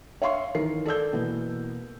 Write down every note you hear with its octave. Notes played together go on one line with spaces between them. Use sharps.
C#5 E5 F5 C6 C#6 C7
D#3 E3 A#4 C7
A4 D5 E6 G6
B2 E3 A#3 B3